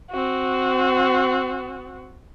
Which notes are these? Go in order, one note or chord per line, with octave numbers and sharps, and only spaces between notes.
C4 F#4